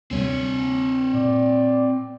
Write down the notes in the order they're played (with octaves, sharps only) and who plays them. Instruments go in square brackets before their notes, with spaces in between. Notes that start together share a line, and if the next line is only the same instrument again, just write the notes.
[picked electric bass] D2 C3 G3 [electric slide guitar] C4 C#5
[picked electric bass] A#2 [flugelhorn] D5